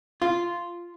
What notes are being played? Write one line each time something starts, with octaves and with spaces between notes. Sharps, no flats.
F4